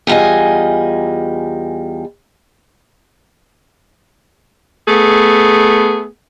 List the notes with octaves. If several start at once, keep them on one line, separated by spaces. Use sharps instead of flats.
E2 G3 F4 D#5 G#5
A3 B3 G#4